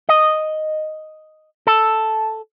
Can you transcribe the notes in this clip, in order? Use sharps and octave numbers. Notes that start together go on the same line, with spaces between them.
D#5
A4